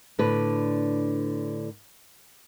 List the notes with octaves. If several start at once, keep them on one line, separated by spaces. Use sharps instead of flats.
A2 D3 D4 B4